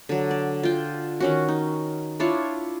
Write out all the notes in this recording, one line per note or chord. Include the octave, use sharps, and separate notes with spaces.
D3 F#3
D5
F4 G5
D#3 C#4 F#4
D#4
D4 E4 F4 C#5